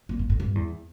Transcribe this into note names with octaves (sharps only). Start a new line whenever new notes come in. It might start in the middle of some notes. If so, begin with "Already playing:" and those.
A#2
A#2
A2
G2
E2